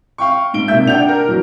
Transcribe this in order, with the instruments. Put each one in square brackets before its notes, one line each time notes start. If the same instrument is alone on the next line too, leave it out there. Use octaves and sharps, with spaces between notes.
[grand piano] F5 G5 C#6
G#2 D7 G7
[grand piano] C3 A#3 E5 [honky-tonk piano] G6
[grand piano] D4 F#5 [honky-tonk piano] G5 G6 F7
[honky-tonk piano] A#4
[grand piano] E3 F#3